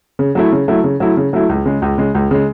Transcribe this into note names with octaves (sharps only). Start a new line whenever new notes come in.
C#3
F#3 A3 E4
C#3
F#3 A3 E4
C#3
F#3 A3 E4
C#3
F#3 A3 E4
C#2
C#3 G#3
C#2
C#3 G#3
C#2
C#3 G#3